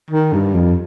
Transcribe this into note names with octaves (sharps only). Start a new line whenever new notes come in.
D#3
G2
F2